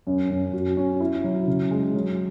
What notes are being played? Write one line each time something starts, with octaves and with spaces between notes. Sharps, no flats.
F#2
F#2
F#4
C#4
E4
F#3
C#3
G#3
F#3